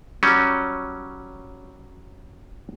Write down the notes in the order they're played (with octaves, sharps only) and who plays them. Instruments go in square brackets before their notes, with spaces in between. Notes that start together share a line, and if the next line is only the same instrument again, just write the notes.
[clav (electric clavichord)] F#3 G3 C#4